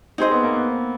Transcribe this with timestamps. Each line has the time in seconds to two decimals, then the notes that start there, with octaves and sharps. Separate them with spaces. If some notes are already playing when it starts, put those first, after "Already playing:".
0.18 C4 D#4 G#4 C5 D#5
0.31 B3
0.43 A#3
0.56 B3